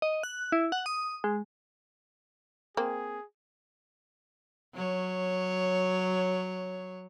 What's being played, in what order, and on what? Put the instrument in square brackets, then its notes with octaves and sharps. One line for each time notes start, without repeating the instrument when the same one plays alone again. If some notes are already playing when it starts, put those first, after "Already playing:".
[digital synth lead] D#5
F#6
E4
F#5
D#6
G#3
[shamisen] A#3 C4 [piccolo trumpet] G#4
[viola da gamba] F#3 C#5